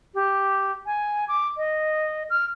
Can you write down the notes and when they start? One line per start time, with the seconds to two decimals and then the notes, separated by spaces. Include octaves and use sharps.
0.15 G4
0.86 G#5
1.28 D6
1.57 D#5
2.30 F6